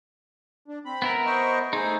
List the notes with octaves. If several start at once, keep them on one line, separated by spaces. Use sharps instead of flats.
D4
C4 B5
B3 E4 A#4
C5 D#5 C#6
A3 D#4 G#4 C5